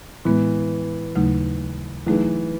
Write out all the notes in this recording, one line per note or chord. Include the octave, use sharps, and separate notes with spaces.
A2 E3 G#3 B3
D#2 C#3 F#3 A3 D#4
E3 F#3 A3 D#4 G#4 B4